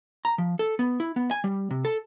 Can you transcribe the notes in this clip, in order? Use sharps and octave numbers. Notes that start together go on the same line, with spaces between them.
A#5
F3
A4
B3
E4
B3
G#5
G3
C3
A4